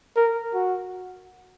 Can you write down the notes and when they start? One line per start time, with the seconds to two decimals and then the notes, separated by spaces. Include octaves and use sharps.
0.16 A#4
0.54 F#4